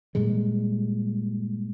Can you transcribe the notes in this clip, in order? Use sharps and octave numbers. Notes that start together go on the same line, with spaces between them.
G2 A#2 G3 G#3